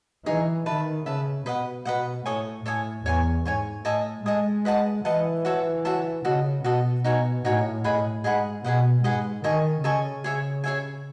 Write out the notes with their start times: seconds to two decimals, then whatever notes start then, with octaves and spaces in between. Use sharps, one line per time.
0.25 E3 D#4 G#4 C#5
0.66 D#3 B4 E5 A5
1.05 C#3 B4 E5 A5
1.46 B2 B4 D#5 F#5
1.85 B2 B4 D#5 F#5
2.26 A2 A4 C#5 G#5 D#6
2.65 A2 A4 C#5 G#5 D#6
3.06 E2 C#5 G#5 C#6
3.45 G#2 C#5 G#5 C#6
3.85 A2 A4 D#5 G#5 D#6
4.25 G#3 A4 D#5 G#5 D#6
4.65 B4 D#5 F#5 A5
5.05 E3 B4 D#5 F#5 A5
5.45 F#4 C#5 E5 A5
5.85 F#4 C#5 E5 A5
6.24 C#3 F#4 A4 D#5
6.64 B2 F#4 A4 D#5
7.04 B2 D#4 F#4 C#5 G#5
7.44 A2 D#4 F#4 C#5 G#5
7.84 A2 G#4 D#5 F#5 B5
8.24 G#2 G#4 D#5 F#5 B5
8.64 B2 G#4 B4 D#5 F#5
9.04 G#2 G#4 B4 D#5 F#5
9.44 D#3 A4 D#5 G#5 C#6
9.84 C#3 A4 D#5 G#5 C#6
10.24 G#4 C#5 E5 G#5
10.64 G#4 C#5 E5 G#5